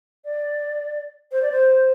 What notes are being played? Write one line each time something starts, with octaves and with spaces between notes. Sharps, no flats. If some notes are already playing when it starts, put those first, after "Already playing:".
D5
C5
D5
C5